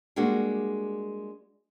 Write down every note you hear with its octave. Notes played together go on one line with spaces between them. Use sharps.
G3 G#3 A#3 D4 F#4